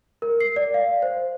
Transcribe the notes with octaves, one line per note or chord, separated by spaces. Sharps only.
A#4
C7
D5
F5
C5